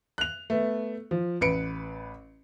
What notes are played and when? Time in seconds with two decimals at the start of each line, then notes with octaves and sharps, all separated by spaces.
0.18 F#6 F7
0.50 A3 B3
1.11 F3
1.41 A1 B4 C#7 D7